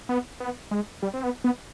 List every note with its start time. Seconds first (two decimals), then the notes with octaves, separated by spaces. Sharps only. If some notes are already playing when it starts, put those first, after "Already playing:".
0.09 B3
0.40 B3
0.71 G#3
1.02 G3
1.14 C4
1.24 B3
1.44 B3